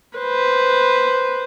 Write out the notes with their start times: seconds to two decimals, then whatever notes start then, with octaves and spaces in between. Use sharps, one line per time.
0.18 B4 C5